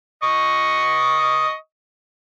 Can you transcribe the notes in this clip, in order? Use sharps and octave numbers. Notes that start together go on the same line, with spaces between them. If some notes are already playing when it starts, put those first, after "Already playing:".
D#5 C#6 D#6